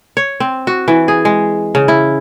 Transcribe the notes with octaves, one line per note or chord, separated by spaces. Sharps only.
C#5
C4
F#4
E3
G#4
G#3
C#3
E4